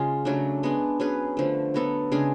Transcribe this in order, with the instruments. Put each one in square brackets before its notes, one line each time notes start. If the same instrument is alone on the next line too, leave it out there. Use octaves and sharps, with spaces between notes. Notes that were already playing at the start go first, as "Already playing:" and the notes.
Already playing: [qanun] C#3 G#3 F4
C#3 F#3 A3 D4
G#3 B3 D4
F#3 C#4 G#4 B4
D3 F3 A3
F#3 B3 F#4 A4
C#3 G#3 D4 G#4